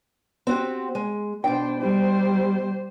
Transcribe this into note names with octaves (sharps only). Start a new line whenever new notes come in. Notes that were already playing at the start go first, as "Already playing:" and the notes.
C4 F#4 G4
G#3
B2 D4 C5 G5
G3 C5